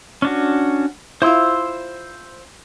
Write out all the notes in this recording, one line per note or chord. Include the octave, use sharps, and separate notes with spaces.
C#4 D4 F#4
E4 F4 C5 C6 E6